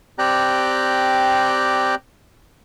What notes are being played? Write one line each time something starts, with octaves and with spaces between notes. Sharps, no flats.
C4 G4 D5 G5 A#5 F#6